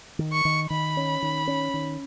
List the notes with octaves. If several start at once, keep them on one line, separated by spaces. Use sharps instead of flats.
D#3
C#6
D#3
D#3 B5
C#4
D#3
C#4
D#3